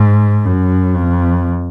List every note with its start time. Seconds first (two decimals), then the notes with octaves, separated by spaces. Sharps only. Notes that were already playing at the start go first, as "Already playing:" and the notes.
Already playing: G#2
0.45 F#2
0.95 F2